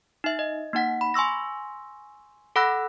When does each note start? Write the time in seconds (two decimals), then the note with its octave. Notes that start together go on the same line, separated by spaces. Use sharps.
0.24 D#4 E5
0.39 D#5
0.73 A#3 D#4 F#5 B6
1.01 B5
1.14 G#5 C6 C#6 E6 A#6
2.56 A4 F#5 B5 E6 F#6 A#6